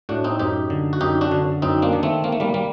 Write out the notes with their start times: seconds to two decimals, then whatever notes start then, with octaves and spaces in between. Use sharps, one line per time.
0.09 A2 D4 F#4
0.24 C4 D#4
0.39 F#2 D#4 G4
0.70 D3
0.93 F#4
1.01 F#2 D#4 G4
1.21 D4 F#4
1.32 D3
1.62 F#2 C4 D#4
1.82 A#3 D4
1.93 D#3
2.03 A3 C4
2.24 D#3 A#3
2.32 A3
2.40 G3 A#3
2.54 G3 A#3